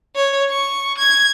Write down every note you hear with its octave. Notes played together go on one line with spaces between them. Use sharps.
C#5
C#6
G#6